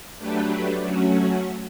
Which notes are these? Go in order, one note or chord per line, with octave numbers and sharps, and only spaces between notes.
F#3 A3 D4 G4 B4
F#3 A3 C#4 F#4